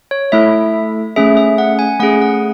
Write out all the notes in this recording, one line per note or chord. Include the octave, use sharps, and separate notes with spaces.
C#5
A3 E4 A4 E5
A3 C#4 G#4 E5
E5
F#5
G#5
A3 C#4 G#4 F#5
F#5